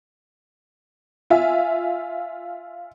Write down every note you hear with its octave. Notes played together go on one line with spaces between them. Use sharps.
F4 E5 G#5